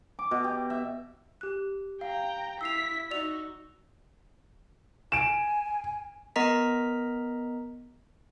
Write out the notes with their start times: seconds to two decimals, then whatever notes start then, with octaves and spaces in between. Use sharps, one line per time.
0.19 D6
0.31 B2
0.44 G4
0.70 E5
1.41 G4 F#6
2.01 F5 G5 A#5
2.61 E4 E6 B6 C7 F7
3.11 D#4 F#4 D5 E6 F7
5.12 G#5 D7 E7
6.36 B3 A#4 D#5 A#5 B6